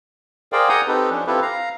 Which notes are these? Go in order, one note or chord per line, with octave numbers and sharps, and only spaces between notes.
G#4 A#4 C5 D5 F5 G5
F#5 G#5 A#5 D#6 G6
C4 D#4 G4 A4 B4
F3 C#4 D4
C4 E4 F4 G4 A4 B4
F5 A#5